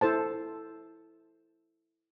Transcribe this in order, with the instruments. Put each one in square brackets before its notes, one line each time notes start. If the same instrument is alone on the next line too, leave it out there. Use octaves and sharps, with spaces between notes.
[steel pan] E4 A4 C5 A5